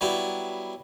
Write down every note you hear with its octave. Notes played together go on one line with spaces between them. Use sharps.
F#3 G3 B3 E4